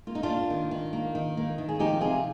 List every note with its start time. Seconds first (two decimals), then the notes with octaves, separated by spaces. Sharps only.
0.07 A#3 F4
0.15 D#4
0.23 D4 F4
0.29 A#3
0.50 D#3
0.71 D#3
0.93 A#3
1.15 D#3
1.37 A#3
1.58 D#3
1.69 G#4
1.79 F3 D#4 G4
2.01 C3 F4 G#4